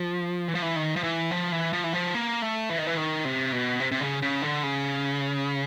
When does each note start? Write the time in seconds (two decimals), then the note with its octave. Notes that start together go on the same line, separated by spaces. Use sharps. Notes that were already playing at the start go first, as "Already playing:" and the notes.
Already playing: F3
0.48 E3
0.55 F3
0.62 E3
0.76 D#3
0.96 F3
1.04 E3
1.31 F3
1.52 E3
1.73 F3
1.84 E3
1.93 F3
2.14 A#3
2.42 A3
2.70 E3
2.78 D#3
2.87 E3
2.97 D#3
3.25 C3
3.53 B2
3.80 C3
3.92 C3
4.01 C#3
4.22 C#3
4.42 D3
4.63 C#3